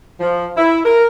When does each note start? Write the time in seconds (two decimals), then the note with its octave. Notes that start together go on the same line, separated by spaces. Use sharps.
0.20 F3
0.57 E4
0.85 A#4